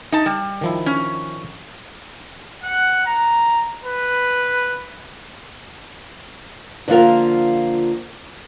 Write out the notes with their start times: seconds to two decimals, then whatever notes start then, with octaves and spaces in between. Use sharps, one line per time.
0.12 D#4 A5
0.26 G3
0.61 D#3 F3 E4
0.86 C#4
2.64 F#5
3.06 A#5
3.84 B4
6.88 D3 F3 A#3 F4 A#4